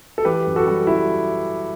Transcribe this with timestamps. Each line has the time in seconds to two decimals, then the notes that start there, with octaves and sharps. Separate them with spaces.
0.18 A4
0.25 E3 G4 B4
0.47 F#2
0.56 F#4 A4
0.67 G3
0.87 G3 E4